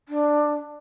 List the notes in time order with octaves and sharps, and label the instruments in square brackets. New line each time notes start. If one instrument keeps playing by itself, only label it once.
[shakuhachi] D4